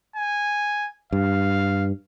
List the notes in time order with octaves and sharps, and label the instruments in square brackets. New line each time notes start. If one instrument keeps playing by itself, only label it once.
[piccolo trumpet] G#5
[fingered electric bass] G2 [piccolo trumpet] F5